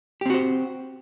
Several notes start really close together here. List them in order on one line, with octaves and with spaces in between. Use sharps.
G4 C4 F#4 C5